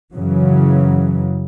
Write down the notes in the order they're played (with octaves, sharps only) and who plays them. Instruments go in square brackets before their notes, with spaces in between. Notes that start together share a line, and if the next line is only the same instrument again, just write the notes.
[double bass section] F#2 C#3 E3 F#3